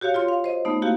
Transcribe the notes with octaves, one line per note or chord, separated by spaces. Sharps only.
F#4 G4 C#5 F5
F4 C#5 C6
F5
C5 D#5
A3 B3 D#4
A#3 E4 F#4 G4 F5